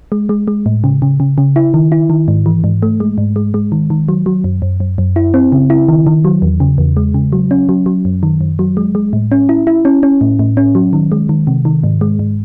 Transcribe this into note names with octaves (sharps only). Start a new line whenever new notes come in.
G#3
G#3
G#3
A2
C#3
C#3
C#3
C#3
E4
D#3
E4
D#3
G#2
E3
G#2
A3
G#3
G#2
G#3
G#3
D#3
D#3
F#3
F#3
F#2
F#2
F#2
F#2
E4
C4
C#3
E4
D#3
D#3
F#3
E2
C#3
E2
G#3
C#3
F#3
C#4
F#3
F#3
F#2
D#3
F#2
F#3
G#3
G#3
A2
C#4
E4
E4
C#4
C#4
A2
A2
C#4
F#3
D#3
G#3
D#3
C3
D#3
G#2
G#3
G#2